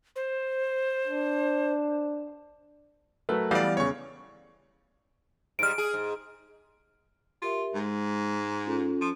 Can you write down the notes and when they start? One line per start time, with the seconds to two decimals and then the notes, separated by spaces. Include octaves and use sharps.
0.16 C5
1.07 D4
3.29 F#3 A3 A#4 B4
3.51 E3 G3 B3 D5 F5
3.77 E2 C#3 C#5 C#6
5.59 G#2 G3 F6 D7
5.78 G#4
5.94 G#2
7.42 F4 G4 A#4 E5
7.74 G#2 G#3
8.66 C#4 F4 A4
9.01 F3